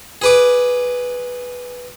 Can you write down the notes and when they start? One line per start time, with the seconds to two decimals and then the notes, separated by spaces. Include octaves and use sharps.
0.22 G#4 B4 D6